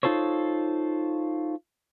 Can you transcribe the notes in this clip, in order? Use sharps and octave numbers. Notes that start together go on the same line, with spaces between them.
D#4 F4 A4 C5 C#5